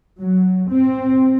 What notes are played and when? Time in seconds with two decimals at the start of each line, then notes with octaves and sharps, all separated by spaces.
0.19 F#3
0.69 C4